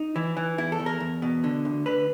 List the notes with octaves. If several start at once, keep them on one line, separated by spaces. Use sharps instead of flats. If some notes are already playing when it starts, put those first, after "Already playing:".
Already playing: D#4
E3
E3
E2 E4
A4
E2
A#4
E2
B2
D3
D2
D3 B4